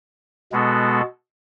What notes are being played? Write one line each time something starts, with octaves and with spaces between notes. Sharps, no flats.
B2 G#3 B3 F#4 A4